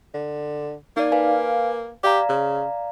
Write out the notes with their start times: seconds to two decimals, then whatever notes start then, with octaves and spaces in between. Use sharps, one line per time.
0.14 D3
0.97 A#3 D#4 D5
1.12 B4 F5 G#5
2.04 G4 D5 F5 A#5
2.29 C#3